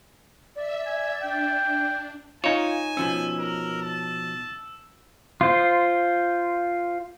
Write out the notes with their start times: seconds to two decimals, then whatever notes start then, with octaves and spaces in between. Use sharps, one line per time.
0.56 D5 E5
0.86 G#5
1.22 D4 G5
2.44 D#4 F4 C#5 G#5 E7
2.97 B2 F3 C#4 E6
3.39 A#4
3.82 A5
5.41 F4 C5